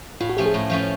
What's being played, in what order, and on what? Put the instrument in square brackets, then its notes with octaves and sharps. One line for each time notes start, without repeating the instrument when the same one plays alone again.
[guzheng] A2 [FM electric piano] F4
[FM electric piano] F#4
[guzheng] F3 A3 C#4 [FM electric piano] G4
[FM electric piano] G#4
[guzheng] A2
F3 A3 C#4